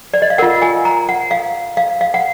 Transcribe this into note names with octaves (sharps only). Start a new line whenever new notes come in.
D5
D#5
F5
F4 A#4 F#5
G#5
A#5
F#5
F5
F5
F5
F#5